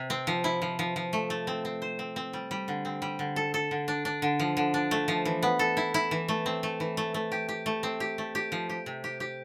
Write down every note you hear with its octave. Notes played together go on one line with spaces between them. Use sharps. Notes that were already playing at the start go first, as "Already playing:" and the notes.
Already playing: C3
C4
F3
E4
F3
F3
F3
A3
A3
C4
C4
C5
C4
C4
G3
G3
D3
C4
G3
D3
A4
A4
D3
D4
D4
D3
F3
D3
D4
A3
F3
E3
B3
A4
E4
E4
E3
A3
C4
A3
E3
A3
A3
G4
G4
A3
C4
G4
A3
G4
F3
G4
C3
G4
G4